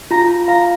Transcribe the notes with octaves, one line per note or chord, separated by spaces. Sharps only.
F4 A#5
F5 A#5